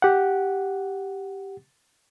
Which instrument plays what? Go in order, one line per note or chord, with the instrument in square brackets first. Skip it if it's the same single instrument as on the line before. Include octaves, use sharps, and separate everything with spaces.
[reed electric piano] G4 F#5